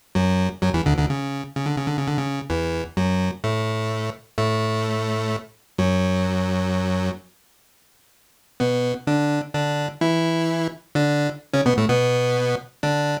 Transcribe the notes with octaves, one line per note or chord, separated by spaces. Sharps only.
F#2 F#3
F#2 F#3
E2 E3
D2 D3
D2 D3
C#3
C#3
D3
C#3
D3
C#3
D3
C#3
E2 E3
F#2 F#3
A2 A3
A2 A3
F#2 F#3
B2 B3
D3 D4
D3 D4
E3 E4
D3 D4
C#3 C#4
B2 B3
A2 A3
B2 B3
D3 D4